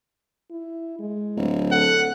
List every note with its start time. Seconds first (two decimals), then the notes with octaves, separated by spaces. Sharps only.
0.51 E4
0.99 G#3
1.37 D1
1.71 A4 F#5